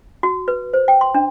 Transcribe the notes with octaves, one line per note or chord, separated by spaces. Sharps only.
F#4
B4
C5
G5
C6
D4